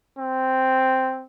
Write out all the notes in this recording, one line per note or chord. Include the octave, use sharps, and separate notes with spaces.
C4